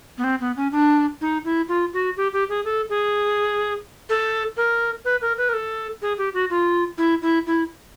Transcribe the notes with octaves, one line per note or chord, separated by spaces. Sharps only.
B3
C4
B3
C#4
D4
D#4
E4
F4
F#4
G4
G4
G#4
A4
G#4
A4
A#4
B4
A#4
B4
A#4
A4
G#4
G4
F#4
F4
E4
E4
E4